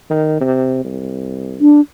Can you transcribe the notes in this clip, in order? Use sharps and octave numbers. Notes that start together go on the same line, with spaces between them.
D#3
C3
C2
D4